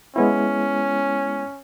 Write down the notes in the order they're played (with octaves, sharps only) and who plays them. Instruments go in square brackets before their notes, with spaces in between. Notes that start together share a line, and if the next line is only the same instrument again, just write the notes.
[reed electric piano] G#3 B3 E4 [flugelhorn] C#4